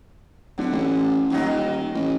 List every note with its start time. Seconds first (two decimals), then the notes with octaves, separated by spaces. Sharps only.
0.58 D1 D3
0.72 A1
1.30 D#1 D#2 F#3 D#4
1.47 D#3
1.94 A1